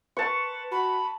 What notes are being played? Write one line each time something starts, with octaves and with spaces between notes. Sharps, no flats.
B4 A5 C#6
F#4 B5